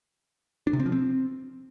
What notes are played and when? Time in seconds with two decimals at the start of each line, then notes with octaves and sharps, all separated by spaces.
0.67 D4
0.73 C3
0.80 C4
0.86 F3
0.92 C4